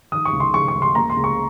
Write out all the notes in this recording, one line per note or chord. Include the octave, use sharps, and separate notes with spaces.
D#3 D#6
C#6
C#2
C6
C#2 C#6
C#6
C#2
C6
A#3 A#5
C6
C#2
C#6